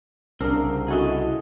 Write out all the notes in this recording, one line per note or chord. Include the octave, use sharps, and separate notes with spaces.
C2 C#3 C4 D4 A#4
E4 F#4 G#4 A4 D#5